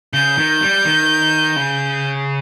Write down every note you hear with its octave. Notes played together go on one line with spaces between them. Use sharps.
C#3 G6
D#3
G3
D#3
C#3